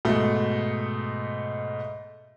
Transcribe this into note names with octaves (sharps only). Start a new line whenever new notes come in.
G#2 B2 A3